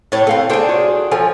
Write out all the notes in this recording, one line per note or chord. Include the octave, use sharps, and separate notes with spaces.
A2 E4 A4 C#5
A3 C4 A4 F5
D4 G#4 A4 C5 G5
F4 F#4 C#5
F3 A4 C#5 G#5